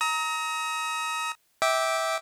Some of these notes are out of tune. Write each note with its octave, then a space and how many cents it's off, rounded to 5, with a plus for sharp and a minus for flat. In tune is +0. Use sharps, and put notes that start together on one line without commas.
A#5 +0 D#6 +40
E5 -20 G5 -5 D6 +0